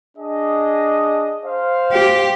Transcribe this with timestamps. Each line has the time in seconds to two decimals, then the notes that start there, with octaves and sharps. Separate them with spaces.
0.17 D4 G#4 D#5
1.46 C5 F5
1.92 G4